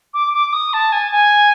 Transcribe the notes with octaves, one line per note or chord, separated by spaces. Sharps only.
D6
D6
D#6
A5
G#5
G#5